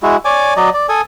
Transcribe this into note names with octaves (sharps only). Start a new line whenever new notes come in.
G#3 E4 F#4
C#5 D5 G#5 D6
F#3 D5 D#5
D5
A4 G#5 D#6